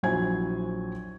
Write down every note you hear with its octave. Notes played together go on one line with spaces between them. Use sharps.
A#1 F#3 E4 C5 G#5 G#6